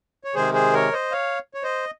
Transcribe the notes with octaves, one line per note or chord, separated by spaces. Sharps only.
C#5
C3 D#3 G#3 G#4 C5
G#4 C5
A#4 C#5
C5 D#5
C#5 F5
C#5
C5 D#5